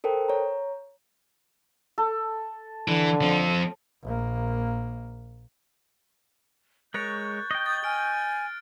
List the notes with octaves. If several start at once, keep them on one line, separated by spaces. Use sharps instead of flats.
A4 A#4 C5 G5
C#5 A#5
A4
D3 E3
F3 C4
A#1 A#3
G#3 A#4 C#5 C#6 F#6 G6 A6
D#5 G5
D#6 A6
G#5 F6 D7